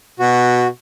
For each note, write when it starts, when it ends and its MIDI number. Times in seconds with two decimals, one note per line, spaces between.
0.19 0.68 47
0.19 0.67 66